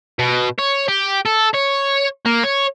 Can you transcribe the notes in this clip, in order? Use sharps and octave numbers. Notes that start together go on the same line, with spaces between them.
B2
C#5
G4
A4
C#5
A#3
C#5